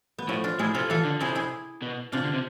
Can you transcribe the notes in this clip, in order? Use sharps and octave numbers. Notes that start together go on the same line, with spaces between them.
B3
A2 F3 A3
D4 F4
A2 E4 G#4
C3 F4 A4
E3 F4 A4
D3
C3 E4 G#4
E4 G#4
B2
C3 D4 F4
D3
C3